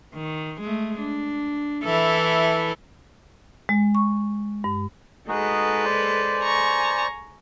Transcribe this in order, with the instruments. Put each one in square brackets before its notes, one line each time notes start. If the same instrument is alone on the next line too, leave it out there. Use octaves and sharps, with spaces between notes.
[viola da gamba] D#3
G#3 A3
D4
E3 E4 A4
[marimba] G#3
C#6
G2
[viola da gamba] G#3 A4 B4 [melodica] D#4 F#4 G#4
[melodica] C5 D5
[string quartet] G#5 A#5 C#6